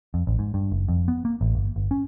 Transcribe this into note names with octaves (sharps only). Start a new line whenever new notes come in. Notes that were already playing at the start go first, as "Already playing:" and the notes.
F2
A1
G#2
G2
F#1
F2
B3
A#3
A1
G1
G1
C#4